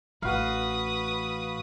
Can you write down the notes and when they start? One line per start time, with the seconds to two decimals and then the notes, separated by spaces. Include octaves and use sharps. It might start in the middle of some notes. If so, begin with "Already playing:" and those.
0.22 A1 F#4 B4 F5 D#6